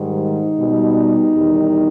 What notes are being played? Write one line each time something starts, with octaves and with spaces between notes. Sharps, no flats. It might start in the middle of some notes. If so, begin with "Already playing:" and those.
Already playing: G#2 D#3 G3
D#4
B2 G3
E2 D#3 G3